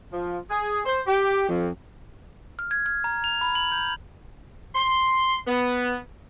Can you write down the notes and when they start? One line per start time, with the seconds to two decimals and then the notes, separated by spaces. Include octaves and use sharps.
0.12 F3
0.50 G#4
0.86 C5
1.07 G4
1.49 F2
2.59 F6
2.71 G#6
2.86 F6
3.04 A#5
3.24 F7
3.41 B5
3.55 F#7
3.72 G6
4.75 C6
5.48 B3